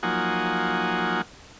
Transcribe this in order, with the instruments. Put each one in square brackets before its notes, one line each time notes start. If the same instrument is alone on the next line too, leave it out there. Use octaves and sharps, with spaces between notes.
[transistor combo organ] F3 F#3 A#3 D#4 F#5 G#5